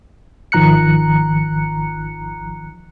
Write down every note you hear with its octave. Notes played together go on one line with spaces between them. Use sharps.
G#1 D#3 F3 A#5 F#6 C#7